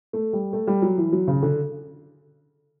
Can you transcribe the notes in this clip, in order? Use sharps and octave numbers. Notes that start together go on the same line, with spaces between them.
A3
G3
A3
G3
F#3
E3
F#3
C#3
D3